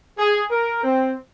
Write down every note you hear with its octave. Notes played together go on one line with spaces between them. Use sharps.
G#4
A#4
C4